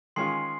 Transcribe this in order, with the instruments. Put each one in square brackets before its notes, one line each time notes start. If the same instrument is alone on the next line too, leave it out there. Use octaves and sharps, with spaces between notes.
[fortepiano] D#3 G#3 C#4 F4 [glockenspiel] C6 C7